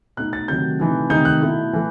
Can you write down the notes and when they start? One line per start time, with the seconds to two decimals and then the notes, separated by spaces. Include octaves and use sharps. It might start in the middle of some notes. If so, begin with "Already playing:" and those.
0.17 B2 A3 D#4 F#6
0.33 A6
0.48 C3 D#3 F#3 A3 G6
0.79 C3 E3 A3 D#4
1.10 C3 D#3 A3 D#4 G6
1.25 F#6
1.41 B2 A3 E4
1.73 E3 A3